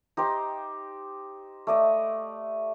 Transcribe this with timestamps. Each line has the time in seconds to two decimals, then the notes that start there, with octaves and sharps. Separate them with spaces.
0.17 D#4 G4 C5 G5
1.67 A3 D5 D#5